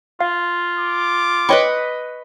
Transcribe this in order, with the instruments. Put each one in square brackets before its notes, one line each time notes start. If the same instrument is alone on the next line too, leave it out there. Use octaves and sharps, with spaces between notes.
[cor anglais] F4 [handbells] F5
[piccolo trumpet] D6
[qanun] B4 D#5 C#6 [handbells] C#5 G5 B5